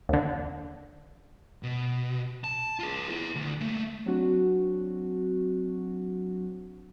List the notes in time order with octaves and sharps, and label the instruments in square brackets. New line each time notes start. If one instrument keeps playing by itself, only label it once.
[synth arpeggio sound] D#2 D3
[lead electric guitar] B2
A5
F4 G#4
E4 G#4
D2
A3 A#3
[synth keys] F#3 C4 D4 F#4